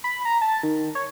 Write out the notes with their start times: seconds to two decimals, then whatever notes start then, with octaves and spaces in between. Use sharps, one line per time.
0.04 B5
0.25 A#5
0.41 A5
0.63 D#3
0.95 C#5